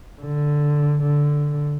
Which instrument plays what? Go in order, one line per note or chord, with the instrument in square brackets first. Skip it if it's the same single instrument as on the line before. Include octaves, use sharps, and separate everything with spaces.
[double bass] D3
D3